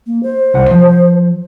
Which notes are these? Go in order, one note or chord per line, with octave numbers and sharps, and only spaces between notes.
A#3
C5
C2 F#5
F3